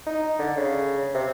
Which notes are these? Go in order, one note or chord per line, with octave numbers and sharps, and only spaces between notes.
D#4
D3
C#3
C3